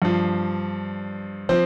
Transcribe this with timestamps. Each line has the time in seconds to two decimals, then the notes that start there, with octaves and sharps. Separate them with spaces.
0.02 G2 F3
1.49 F3 C4 C5